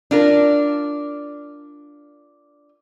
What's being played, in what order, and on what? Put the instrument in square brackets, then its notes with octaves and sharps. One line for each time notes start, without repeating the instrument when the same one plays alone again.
[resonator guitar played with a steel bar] D4 F4 A#4